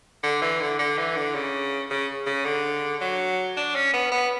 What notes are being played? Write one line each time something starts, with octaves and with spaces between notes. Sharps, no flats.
D3
E3
D3
D3
E3
D3
C#3
C#3
C#3
D3
F#3
D4
C#4
B3
B3